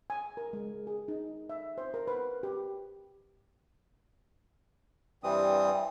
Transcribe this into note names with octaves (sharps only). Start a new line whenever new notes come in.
G#5
A#4
G#3
G#4
D#4
E5
C5
A#4
B4
G4
G2 E3 G3 C4 D#6